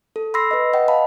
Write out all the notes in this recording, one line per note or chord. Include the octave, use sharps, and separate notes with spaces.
A4
B5 C6 E6 A#6 C7
B4 D#5
D#5 F#5 G5
F5 A5 B5